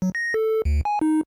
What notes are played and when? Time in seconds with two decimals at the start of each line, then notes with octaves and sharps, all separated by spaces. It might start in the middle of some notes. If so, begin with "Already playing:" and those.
0.02 F#3
0.15 A#6
0.34 A4
0.50 A4
0.65 D2
0.85 G#5
1.01 D#4